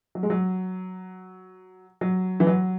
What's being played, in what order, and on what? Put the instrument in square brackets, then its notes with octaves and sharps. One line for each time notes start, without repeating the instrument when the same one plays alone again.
[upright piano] F#3
G#3
F#3
F#3
E3
F#3